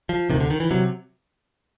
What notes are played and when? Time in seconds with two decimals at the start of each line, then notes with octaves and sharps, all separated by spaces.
0.09 F3
0.30 D2 C3 D#3
0.40 D3
0.50 D#3
0.60 E3
0.71 C3 F#3